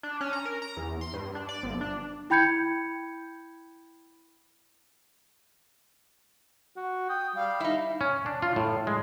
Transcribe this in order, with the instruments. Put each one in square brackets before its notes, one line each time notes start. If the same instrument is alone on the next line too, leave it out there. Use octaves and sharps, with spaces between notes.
[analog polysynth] D4
C#4
A#5
A#4
A#5
E2
C6
G2
D4
D5
G1
D4
[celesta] E4 G5 B5 G6 G#6 C#7
[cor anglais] F#4
[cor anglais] G5 [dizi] D#6
[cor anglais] G3 [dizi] F5
[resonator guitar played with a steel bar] D#4 E4
[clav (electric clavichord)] C#4
D4
F4
A2
G#3